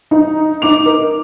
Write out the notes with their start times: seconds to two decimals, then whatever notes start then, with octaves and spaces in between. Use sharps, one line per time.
0.11 D#4
0.62 D#4 D6 F7
0.86 A#4